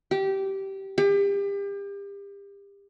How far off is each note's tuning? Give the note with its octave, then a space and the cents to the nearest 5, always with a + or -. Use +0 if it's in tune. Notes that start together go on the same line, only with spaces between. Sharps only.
G4 -15
G4 +35